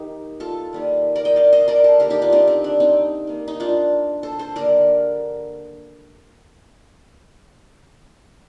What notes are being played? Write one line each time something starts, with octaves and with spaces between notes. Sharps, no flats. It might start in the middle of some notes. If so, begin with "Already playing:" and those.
Already playing: D#3 A#3 D#4 G4
F4 A4
D#3 G3 A#3
A#4 D5
D#5 G5
D5 F5
C5 D#5
A#4 D5
A4 C5
D3 G3 A#3 G4 A#4
D#4 G4
D4 F4
C4 D#4
C4
D4
C4 D#4
D#3 A#3
D#4
D4 F4
A4 C5
A4 C5
D3 G3 A#3 A#4 D5